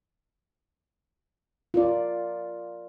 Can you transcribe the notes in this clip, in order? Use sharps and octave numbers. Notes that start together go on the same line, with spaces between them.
F4 A#4 D5